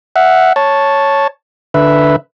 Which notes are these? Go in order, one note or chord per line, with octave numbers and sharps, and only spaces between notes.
E5 F#5
C#5 A5
D3 B4 E5